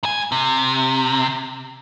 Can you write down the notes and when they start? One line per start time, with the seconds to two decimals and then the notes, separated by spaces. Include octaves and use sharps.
0.03 G#2 G#5
0.32 C3